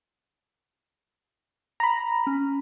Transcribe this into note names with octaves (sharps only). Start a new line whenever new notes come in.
A#5 B5
C#4